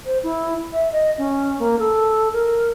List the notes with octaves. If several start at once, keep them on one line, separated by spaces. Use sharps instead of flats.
C5
E4
E5
D#5
C#4
A#3
A4
A#4